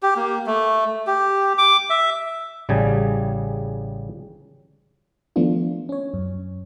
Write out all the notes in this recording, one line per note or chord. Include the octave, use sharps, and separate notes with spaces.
G4
A#3
A3
G4
D6
E5
A1 C#3 G3 G#4 G#5 A5
D#3 F3 A3 B3 D4 F4
C#4 C#5
F#2